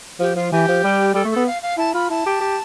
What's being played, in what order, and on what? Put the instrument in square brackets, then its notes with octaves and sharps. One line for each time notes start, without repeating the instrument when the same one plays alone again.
[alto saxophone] F3 [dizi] G4
[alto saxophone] F3 [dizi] F4
[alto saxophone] E3 [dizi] G4
[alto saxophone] F3
G3
[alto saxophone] G3 [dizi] A4
[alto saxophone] A3
[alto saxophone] B3 [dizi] A4
[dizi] F5
F5
[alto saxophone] E4 [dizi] A5
[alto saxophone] F4 [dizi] B5
[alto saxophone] E4 [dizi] A5
[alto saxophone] G4
G4